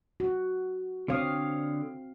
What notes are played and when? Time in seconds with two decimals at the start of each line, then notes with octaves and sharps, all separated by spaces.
0.20 F#4
1.08 D3 C4 C#5 F5 D#6